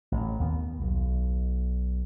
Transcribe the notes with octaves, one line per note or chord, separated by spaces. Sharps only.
A1
D#2 B3
B1